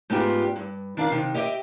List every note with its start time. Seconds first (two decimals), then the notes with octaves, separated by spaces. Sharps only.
0.10 G#2 A3 B3 D4 F4 G4
0.56 G2
0.97 D#3 D4 E5 F5
1.11 C3 D#3
1.34 G4 D#5 E5 G5